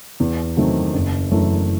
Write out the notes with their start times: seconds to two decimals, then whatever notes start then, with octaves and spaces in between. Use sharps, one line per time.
0.20 E2
0.57 D#3 F#3 A3 C4
0.93 F#1
1.31 F#2 E3 A3